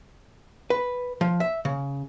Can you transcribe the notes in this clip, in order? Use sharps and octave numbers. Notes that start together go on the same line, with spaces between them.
B4
F3
E5
C#3